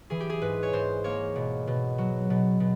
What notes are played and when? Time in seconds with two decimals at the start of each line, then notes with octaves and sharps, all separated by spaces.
0.10 E3 G#4
0.20 G4
0.30 G#4
0.41 G#2 B4
0.63 C#5
0.73 G#2 C5
1.04 A#3 C#5
1.36 B2
1.67 B2
1.98 F#3
2.30 B2
2.60 B2